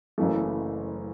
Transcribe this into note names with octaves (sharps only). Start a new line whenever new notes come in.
F#1 F#2 C#3 E3 A3